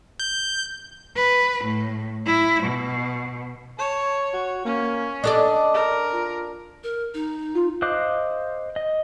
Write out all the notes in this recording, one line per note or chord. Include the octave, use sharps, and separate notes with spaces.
G6
B4
A2
E4
B2
C#5 A5
F#4
A#3 C#4
D4 A4 D5 D#5
A#4
F4
A#4
D#4
F4
C5 D#5 F5 D6 F#6
D#5